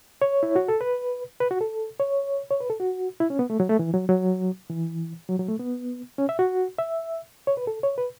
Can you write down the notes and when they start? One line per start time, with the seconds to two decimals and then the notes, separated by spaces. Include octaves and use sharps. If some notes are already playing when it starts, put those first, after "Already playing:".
0.22 C#5
0.43 E4
0.56 F#4
0.68 A4
0.81 B4
1.40 B4
1.51 F#4
1.61 A4
2.00 C#5
2.51 C#5
2.61 B4
2.70 A4
2.80 F#4
3.20 E4
3.30 C#4
3.39 B3
3.50 A3
3.60 F#3
3.69 A3
3.79 E3
3.94 F#3
4.09 F#3
4.70 E3
5.29 F#3
5.39 F#3
5.49 A3
5.59 B3
6.18 C#4
6.29 E5
6.39 F#4
6.79 E5
7.47 C#5
7.57 B4
7.67 A4
7.83 C#5
7.98 B4